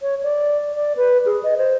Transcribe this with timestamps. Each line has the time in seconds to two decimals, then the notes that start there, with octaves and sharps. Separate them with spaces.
0.01 C#5
0.23 D5
0.75 D5
0.97 B4
1.26 G#4
1.43 D#5
1.58 C5